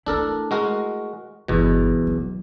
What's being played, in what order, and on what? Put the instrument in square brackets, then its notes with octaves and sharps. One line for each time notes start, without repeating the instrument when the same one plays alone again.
[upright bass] A3 E4 [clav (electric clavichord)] D4 A4 A#4
[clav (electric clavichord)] G#3 F#4 A#4
[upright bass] G1 E3 [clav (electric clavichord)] E2 B2
[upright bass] F#3